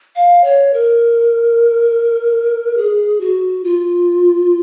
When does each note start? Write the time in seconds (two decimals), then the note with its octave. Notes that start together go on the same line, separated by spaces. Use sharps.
0.16 F5
0.44 C#5
0.74 A#4
2.77 G#4
3.21 F#4
3.64 F4